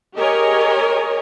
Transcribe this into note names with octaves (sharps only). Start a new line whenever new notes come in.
G4 G#4 A#4 C#5 D#5 G#5